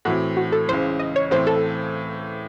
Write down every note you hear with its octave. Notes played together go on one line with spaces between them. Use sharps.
A2 E3 C4 F#4
F#4
A4
C#2 C#3 E3 C5
D#5
C#5
A2 E3 C4 C5
A4